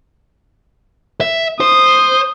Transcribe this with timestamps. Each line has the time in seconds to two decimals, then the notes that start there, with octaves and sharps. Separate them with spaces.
1.21 E5
1.61 C5 D#6